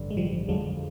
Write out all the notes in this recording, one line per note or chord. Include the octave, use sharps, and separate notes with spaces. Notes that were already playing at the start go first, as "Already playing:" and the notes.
Already playing: A1 G2 D3
G#3
F3 G3
F2 D3 F3 F#3 G#3